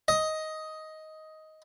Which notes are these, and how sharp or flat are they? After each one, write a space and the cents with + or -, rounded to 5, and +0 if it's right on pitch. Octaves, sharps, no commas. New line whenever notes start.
D#5 +10